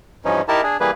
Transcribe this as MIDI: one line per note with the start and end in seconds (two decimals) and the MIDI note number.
0.25 0.41 43
0.25 0.41 52
0.25 0.41 53
0.25 0.41 61
0.25 0.41 63
0.48 0.61 63
0.48 0.61 64
0.48 0.61 67
0.48 0.61 70
0.48 0.61 81
0.63 0.77 62
0.63 0.77 68
0.80 0.91 52
0.80 0.91 55
0.80 0.91 58
0.80 0.91 68
0.80 0.91 71